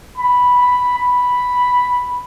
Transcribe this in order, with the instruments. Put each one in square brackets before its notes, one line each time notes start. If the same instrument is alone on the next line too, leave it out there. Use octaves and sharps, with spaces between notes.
[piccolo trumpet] B5
B5
B5